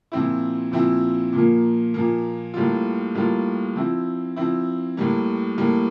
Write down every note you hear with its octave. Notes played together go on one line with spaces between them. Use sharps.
A#2 F3 C4 E4
A#2 F3 C4 E4
A#2 F3 A#3
A#2 F3 A#3
A2 G3 A#3 F4
A2 G3 A#3 F4
F3 C4 E4
F3 C4 E4
A2 G3 A#3
A2 G3 A#3